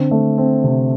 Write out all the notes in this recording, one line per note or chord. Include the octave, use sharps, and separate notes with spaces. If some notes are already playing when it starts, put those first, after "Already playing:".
Already playing: D3 C4
A3
C4
C3